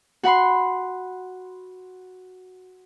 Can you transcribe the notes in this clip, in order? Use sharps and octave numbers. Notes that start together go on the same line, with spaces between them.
F#4 F#5 B5 C6